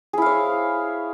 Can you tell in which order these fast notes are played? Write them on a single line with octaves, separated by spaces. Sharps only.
G#4 E4 F5 C#5